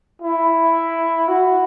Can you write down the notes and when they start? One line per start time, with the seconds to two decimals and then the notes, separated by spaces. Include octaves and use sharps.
0.22 E4
1.29 F#4